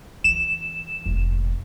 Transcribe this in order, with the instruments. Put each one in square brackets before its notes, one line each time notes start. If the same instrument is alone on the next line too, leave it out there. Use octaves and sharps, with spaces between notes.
[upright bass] E3 [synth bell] E7
[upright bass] F1 A#2